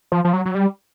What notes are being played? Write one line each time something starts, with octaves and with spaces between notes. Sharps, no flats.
F3
F3
F#3
F#3
G3